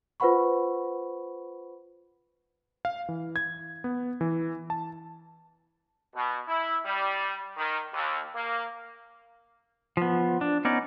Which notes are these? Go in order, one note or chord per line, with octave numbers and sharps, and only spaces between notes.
F4 B4 C5 F#5 B5 C#6
F5
E3
G#6
B3
E3
A5
B2
E4
G3
D#3
D#2
A#3
F3 B3
D4
B3 C#4 D#4 D5